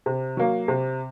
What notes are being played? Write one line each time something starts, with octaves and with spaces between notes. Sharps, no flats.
C3
F#3 A#3
C3